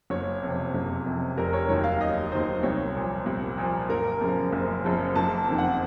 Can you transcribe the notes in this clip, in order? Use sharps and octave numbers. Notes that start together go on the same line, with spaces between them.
F#1 C#5
F2 C3
F#1
F2 C3
F1 A#4
C#5
D#2 D#3 F#3 C#5
F5
F1 D#5
D#2 D#3 F#3 C5
C2 C#5
A#2 F3
C2
A#2 F3
F#1 A#4
F#2 C#3 F3
F#1
F#2 C#3 F3
F#1 A5
F2 D#3
F#5